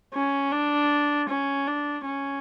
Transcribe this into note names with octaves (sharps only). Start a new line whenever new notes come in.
C#4
D4
C#4
D4
C#4